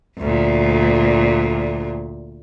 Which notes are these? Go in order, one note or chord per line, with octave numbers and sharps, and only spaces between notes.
D2 A#2